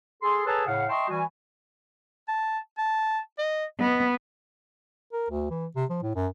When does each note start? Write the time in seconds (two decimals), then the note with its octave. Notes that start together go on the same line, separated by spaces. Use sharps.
0.22 G#4 A4 C6
0.45 G#4 A4 B4 C#5 A5 A#5
0.66 A2 C#3 F5 F#5
0.88 D#5 E5 G5 A5 C6 C#6
1.08 E3 G3 F#4 G#5
2.28 A5
2.78 A5
3.38 D#5
3.80 B3 D#5
5.13 A#4
5.30 D2
5.50 E3
5.76 C3
5.90 F3
6.03 A2
6.15 F#2